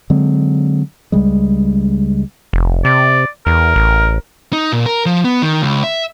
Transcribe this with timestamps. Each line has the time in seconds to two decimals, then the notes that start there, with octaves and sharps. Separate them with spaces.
0.10 D3 F#3 G#3 C4
1.12 C#2 C#3 G3 G#3
2.53 F1
2.85 C3 D5
3.46 E2 A#4
3.76 A1
4.53 D#4
4.72 A#2
4.86 A#4
5.06 F3
5.25 B3
5.42 D#3
5.62 C#2
5.84 E5